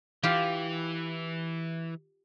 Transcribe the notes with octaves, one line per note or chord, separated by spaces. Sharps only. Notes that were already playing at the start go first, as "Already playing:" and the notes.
E3 F4 G4